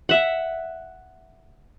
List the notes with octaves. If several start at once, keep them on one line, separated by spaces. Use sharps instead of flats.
E5 F#5